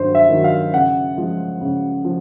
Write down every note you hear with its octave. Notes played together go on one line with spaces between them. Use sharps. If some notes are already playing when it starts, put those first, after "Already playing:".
Already playing: G2 D#3 F#3 C5
E5
D#3 F#3
F5
C#3 F#5
F3 G#3
C#3
F3